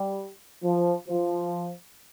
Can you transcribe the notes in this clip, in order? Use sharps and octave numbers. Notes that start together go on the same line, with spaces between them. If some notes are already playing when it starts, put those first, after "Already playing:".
Already playing: G3
F3
F3